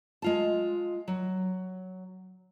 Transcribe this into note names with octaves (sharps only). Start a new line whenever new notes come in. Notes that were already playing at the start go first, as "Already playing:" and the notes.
G#3 F4 A5
F#3